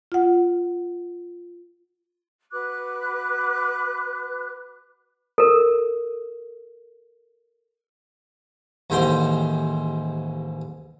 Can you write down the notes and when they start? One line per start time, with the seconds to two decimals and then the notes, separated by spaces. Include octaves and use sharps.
0.12 F4 F#5
2.51 F#4 B4 D6 F#6
5.38 A4 A#4
8.90 A1 D#2 G#2 C5 G5 C6